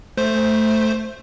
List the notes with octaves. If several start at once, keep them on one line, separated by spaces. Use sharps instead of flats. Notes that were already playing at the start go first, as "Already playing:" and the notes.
A3 C5